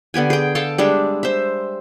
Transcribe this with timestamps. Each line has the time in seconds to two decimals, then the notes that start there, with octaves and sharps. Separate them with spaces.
0.14 D3 B3 G4 G#5
0.30 G#4 G5
0.55 A4 F5 G5 A5
0.78 G3 G#3 D4 E5
1.23 C5 E5